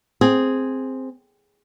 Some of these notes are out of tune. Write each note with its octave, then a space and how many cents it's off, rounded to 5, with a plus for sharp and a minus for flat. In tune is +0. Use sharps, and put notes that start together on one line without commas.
C4 +0 G#4 +0